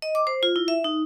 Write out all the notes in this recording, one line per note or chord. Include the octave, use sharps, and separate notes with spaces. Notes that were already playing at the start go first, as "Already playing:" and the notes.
D#5
D6
C5
F4
E4
E5
D#4